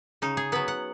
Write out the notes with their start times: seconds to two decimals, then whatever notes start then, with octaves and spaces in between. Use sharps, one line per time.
0.22 C#3 D#4
0.37 G#4
0.52 F#3 B3 B4
0.68 F#5